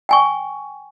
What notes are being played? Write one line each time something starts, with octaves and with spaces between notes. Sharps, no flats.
G5 G#5 C#6